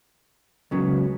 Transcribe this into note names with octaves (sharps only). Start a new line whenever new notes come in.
C#2 C#3 F#3 B3